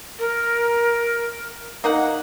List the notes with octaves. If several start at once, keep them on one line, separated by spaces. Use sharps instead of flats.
A#4
A#3 D#4 F#5